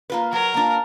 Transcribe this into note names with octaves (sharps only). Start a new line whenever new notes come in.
A#3 F4 B4
F#3 A#4
A#3 D4 F4